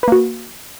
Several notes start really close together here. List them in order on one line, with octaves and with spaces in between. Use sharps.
B4 A#3 F#4